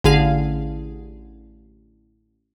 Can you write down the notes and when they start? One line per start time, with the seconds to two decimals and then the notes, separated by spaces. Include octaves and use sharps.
0.04 A1 D3 G#4 F5